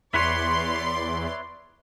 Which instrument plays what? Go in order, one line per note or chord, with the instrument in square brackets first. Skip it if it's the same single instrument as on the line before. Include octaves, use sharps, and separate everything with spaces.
[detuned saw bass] E2 [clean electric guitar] E4 B4 C#5 [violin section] D5 C6